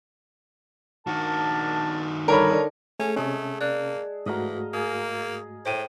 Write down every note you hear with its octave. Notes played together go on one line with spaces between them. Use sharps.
D#3 D4 F#4 A#4 A5
D3 G3 D#4 A#4 C#5 B5
A3 C#4 G#4 A4
C3 G#3 A3 C#4 G#4 A4
A#3 D5 F#6
G#2 E3 A3 F#4 D#5 F5 A#5
A#3 G#4
A2 C5 G5 D#7